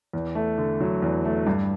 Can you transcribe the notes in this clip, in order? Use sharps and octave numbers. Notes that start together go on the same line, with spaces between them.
E2
A3
D3
F#3
E2
A3
G2